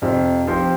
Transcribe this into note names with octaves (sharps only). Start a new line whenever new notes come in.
F2 C3 F3
F3 C4 G4 C5